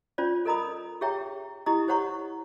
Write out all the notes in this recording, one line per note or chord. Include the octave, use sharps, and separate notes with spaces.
C#4 F4 C5 D5
A4 A#4 D#5 A#5 B5 D#6
G4 G#4 C#5 E5 G5 A#5
E4 G4 D#5 A#5 D#6
G4 C5 C#5 F#5 A#5 C#6